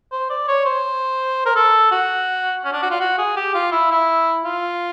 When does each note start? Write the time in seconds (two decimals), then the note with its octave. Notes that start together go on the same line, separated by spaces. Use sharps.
0.12 C5
0.30 D5
0.48 C#5
0.65 C5
1.46 A#4
1.56 A4
1.91 F#4
2.64 C#4
2.73 D4
2.82 F#4
2.91 F4
3.00 F#4
3.18 G#4
3.36 G4
3.54 F4
3.72 E4
3.91 E4
4.44 F4